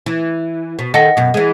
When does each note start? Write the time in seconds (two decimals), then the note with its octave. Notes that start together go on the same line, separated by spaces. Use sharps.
0.06 E3
0.79 B2
0.94 D#3 A4 D#5 F#5 A#6
1.17 F#2 B2
1.34 E3 G#3